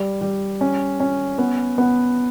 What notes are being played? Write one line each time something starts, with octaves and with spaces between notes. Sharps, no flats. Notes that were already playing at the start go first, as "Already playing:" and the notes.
Already playing: G3
G3
C#4
C#4
B3
B3